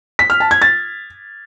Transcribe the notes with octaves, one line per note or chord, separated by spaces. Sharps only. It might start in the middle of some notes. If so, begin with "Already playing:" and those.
B6
F6
A5
G#6
A6